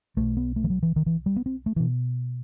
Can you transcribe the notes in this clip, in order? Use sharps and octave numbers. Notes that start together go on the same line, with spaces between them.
B1 B2 A3
B3
A3
E3
F#3
E3
D#3
E3
G3
B3
C4
A3
B2 E3